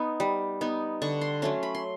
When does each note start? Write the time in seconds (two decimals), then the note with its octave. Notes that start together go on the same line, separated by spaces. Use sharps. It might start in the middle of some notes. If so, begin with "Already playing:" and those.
Already playing: B3 D#4
0.20 G3
0.61 B3 D#4
1.02 D3 C#6
1.21 C6
1.42 F#3 A3 C#4 C6
1.63 B5
1.75 C6